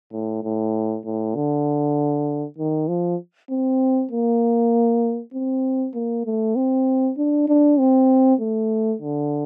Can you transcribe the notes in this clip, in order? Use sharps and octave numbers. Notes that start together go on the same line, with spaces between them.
A2
A2
A2
D3
D#3
F3
C4
A#3
C4
A#3
A3
C4
D4
D4
C4
A3
D3